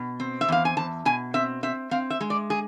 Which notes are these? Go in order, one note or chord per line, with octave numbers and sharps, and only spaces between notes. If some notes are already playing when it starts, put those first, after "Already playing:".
Already playing: B2
C4
E5
E2 F5
G#5
E2 A5
B2 G#5
C4 E5
C4 E5
C4 F5
E5
G#3
D5
G#4